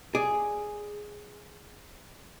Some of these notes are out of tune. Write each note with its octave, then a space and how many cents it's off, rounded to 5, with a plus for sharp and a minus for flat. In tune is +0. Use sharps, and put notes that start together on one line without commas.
G#4 +0 D5 +0